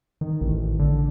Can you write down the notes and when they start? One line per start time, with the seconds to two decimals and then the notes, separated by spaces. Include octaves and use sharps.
0.21 D#3
0.41 A1
0.79 D3